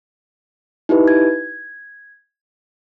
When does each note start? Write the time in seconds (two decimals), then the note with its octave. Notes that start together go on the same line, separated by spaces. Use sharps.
0.89 D#4 E4 G4 B4
1.08 G#6